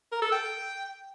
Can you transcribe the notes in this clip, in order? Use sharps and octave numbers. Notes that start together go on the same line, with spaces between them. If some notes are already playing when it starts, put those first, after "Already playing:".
A#4
A4
G5